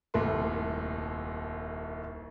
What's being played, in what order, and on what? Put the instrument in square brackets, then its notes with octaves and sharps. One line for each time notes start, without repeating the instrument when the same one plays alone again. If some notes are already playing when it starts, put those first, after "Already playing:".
[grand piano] D#1 C2 A3 C6